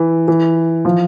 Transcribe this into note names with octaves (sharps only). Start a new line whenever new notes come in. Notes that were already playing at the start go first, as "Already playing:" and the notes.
Already playing: E3
E3
F3